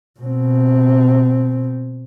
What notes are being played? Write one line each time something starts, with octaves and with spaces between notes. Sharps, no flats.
B2 C4